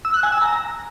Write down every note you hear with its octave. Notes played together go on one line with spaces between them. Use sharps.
E6
F#6
G#5
E6
A#5